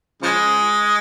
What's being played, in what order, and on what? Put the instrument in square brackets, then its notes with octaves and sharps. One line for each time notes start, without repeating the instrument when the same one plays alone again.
[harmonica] C#3 F3 G#3